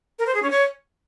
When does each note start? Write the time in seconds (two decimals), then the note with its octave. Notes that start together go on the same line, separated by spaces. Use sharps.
0.19 A#4
0.27 C5
0.35 G#4
0.42 C#4
0.50 C#5